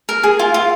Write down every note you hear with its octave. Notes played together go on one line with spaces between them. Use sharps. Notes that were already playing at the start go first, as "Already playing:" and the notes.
A#4
G#4
F4
F4